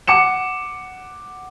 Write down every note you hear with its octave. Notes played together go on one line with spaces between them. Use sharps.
F#5 D6 C#7 E7